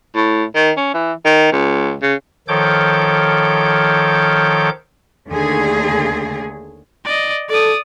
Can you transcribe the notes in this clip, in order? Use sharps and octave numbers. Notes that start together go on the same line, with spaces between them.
A2
D#3
C#4
E3
D#3
C#2
C#3
D#3 F3 A4 C#5 D6 G6
D#2 D3 A3 G#4
D5 D#5
A4 D5 D#6